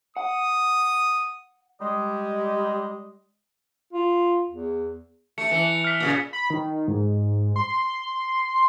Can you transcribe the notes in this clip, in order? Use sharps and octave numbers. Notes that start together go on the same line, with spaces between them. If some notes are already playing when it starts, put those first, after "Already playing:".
F#5 D#6
G3 G#3 D#5
F4
E2
A3 C#7
E3
F6 B6
A#2 C#3
B5
D#3
G#2
C6